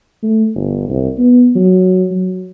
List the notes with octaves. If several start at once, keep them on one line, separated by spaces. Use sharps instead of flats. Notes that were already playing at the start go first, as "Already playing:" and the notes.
A3
G1
C2
B3
F#3
F#3